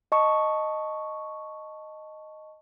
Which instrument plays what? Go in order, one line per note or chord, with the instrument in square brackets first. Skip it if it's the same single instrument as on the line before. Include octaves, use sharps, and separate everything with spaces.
[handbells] D#5 A5 C#6